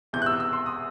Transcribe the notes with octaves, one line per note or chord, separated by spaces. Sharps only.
E1 E2 C3 E3 G6
F#6
E6
E6
C6
D#6